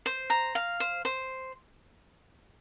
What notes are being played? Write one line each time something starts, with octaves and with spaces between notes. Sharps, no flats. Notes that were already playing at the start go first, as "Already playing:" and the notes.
C5
A#5
F5
C5
C5